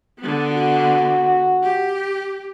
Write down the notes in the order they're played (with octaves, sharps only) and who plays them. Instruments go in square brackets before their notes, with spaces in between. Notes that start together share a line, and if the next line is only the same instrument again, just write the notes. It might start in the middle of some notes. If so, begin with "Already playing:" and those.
[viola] D3 B3
[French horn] F#4
[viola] G4